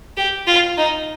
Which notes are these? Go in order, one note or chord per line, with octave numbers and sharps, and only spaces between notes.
G4
F4
D#4